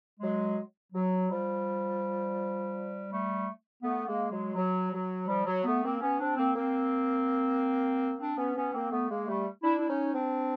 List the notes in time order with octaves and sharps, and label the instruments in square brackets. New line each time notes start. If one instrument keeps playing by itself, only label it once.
[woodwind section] F#3 G#3
F#3
F3 G3
G3 A3
A3 B3
G#3 A#3
F#3 G#3
F#3
F#3
F3 G3
F#3
A3 B3
A#3 C4
B3 C#4
C4 D4
A#3 C4
A#3 C4
C4 D4
B3 C#4
B3 C#4
A#3 C4
A3 B3
G#3 A#3
G3 A3
D4 E4
E4
C#4 D#4
C4 D4